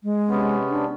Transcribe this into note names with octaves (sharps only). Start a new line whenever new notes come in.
G#3
C3 B3 C#4
D4